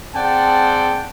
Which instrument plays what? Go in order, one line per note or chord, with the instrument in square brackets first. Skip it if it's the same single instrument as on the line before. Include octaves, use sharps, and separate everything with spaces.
[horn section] C4 G#4 D5 F#5 G5 A5